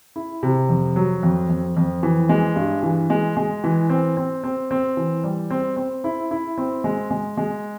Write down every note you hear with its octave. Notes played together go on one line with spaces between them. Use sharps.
E4
C3
F2
F#3
F2
F2
F2
E3
G#3
G2
E3
G#3
G#3
E3
C4
C4
C4
C4
E3
G3
C4
C4
E4
E4
C4
G#3
G#3
G#3